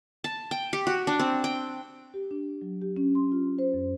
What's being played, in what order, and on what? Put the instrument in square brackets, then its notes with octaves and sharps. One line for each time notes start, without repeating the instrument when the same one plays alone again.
[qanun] A5
G5
G4
F#4
D4
C4
G5
[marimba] G4
D4
F#3
G4
C#4
C6
F4
C5
F#2